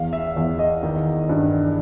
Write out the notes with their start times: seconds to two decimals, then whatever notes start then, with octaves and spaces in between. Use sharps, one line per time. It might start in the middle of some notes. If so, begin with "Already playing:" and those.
Already playing: E2 F5
0.13 E5
0.36 E2 E5
0.59 D#5
0.83 D#3
1.29 G2